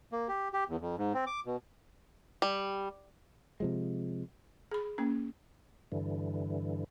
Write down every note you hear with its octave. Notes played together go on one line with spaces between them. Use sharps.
A#3
G4
G4
E2
F2
G#2
C4
D6
B2
G3
C3 F3 G#3
G#4 B5
A#3 C#4
G2 D3 E3